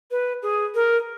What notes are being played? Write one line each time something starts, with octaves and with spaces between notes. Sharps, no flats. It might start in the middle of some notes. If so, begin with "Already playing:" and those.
B4
G#4
A#4